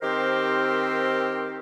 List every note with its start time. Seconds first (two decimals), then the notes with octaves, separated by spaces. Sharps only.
0.02 D#3 C4 G4 A#4 C5